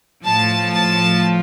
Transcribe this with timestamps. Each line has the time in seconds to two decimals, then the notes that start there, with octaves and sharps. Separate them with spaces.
0.24 A2 F3 A5
0.72 A5